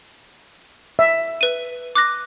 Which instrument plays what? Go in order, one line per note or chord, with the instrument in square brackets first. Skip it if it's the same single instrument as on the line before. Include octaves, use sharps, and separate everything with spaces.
[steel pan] E5
[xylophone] B4 D#7
D6 F#6 A#6